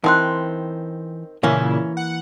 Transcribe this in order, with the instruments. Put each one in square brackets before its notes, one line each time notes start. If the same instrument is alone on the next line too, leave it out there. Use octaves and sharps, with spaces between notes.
[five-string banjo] D#3 C4 [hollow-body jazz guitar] E3 [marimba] A5 C6 F#6
[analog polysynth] A#2 C#3 E4 [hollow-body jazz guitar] E3 A#3 [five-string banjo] C#4
[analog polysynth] F#5